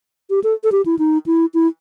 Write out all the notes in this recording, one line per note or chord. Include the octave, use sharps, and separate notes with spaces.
G4
A4
A4
G4
E4
D#4
E4
E4